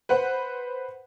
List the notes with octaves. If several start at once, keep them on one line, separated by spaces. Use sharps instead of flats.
B4 C5 F#5